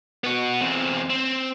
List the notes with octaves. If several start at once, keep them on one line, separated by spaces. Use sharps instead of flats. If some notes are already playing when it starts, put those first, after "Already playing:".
B3 F#4
E2 C4
C4